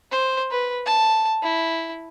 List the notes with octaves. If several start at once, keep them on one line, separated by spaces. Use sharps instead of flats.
C5
B4
A5
E4